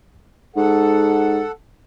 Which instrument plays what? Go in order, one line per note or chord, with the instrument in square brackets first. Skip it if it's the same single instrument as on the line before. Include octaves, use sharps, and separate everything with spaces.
[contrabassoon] G#2 [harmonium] A4 F#5